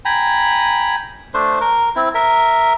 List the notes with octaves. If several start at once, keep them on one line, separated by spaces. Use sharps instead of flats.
G5 G#5 A#5 B5
A3 D4 C5
A#4
C4 E4
A#4 E5